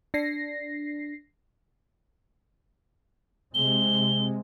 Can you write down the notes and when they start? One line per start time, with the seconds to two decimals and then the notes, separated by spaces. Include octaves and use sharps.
0.14 D4 A#6 C7
3.55 C3 G#3 G7